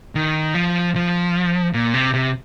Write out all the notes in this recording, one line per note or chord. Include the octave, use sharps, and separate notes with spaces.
D#3
F3
F3
A#2
C3
C3